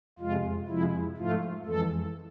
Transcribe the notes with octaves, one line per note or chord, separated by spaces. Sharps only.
F2 C3 G#3 F4
F2 C3 F3 G#3 E4
G#2 F3 A3 F4
F2 E3 G#3 A4